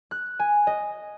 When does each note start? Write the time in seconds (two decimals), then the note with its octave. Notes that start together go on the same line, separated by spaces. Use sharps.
0.11 F#6
0.40 G#5
0.67 D#5